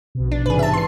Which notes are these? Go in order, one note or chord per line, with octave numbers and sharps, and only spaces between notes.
A#1 B2
D4
G#2 C3 E3 G#4 B4
E5 A5
C6 C7